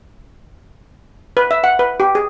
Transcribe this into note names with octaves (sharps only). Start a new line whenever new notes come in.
B4
E5
F#5
B4
G4
G#4